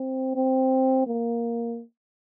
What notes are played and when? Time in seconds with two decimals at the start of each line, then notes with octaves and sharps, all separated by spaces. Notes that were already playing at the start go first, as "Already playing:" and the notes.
Already playing: C4
0.35 C4
1.07 A#3